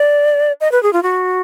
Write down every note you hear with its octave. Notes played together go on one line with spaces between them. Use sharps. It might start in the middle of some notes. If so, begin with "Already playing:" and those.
Already playing: D5
D#5
B4
G#4
F4
F#4